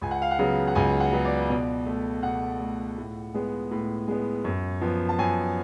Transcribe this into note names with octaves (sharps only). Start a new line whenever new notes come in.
C#2 G#5
F#5
F5
F#5
C#3 F#3 B3
F#5
C#2 G#5
F#5
C#3 F#3 B3
D5
B2 D5
A3
B2 F#5
A3
A2
G#3 B3
A2
G#3 B3
F#2
F3 B3
A5
F#2 G#5